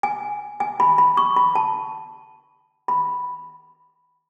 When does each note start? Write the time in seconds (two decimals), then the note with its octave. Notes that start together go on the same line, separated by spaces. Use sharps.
0.03 G#5
0.60 G#5
0.80 B5
0.98 B5
1.17 C#6
1.36 B5
1.55 A5
2.88 B5